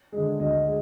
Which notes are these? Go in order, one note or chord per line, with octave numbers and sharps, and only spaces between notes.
D3 G#3
D2 D#5
G#3